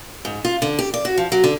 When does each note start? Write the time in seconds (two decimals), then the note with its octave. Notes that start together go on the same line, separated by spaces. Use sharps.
0.25 G#2
0.45 F4
0.62 D3
0.79 G4
0.94 D5
1.05 F#4
1.18 F3
1.32 F#3
1.44 D3